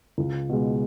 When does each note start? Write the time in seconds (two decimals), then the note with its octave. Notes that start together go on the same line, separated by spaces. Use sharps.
0.18 C#2
0.49 B2 G#3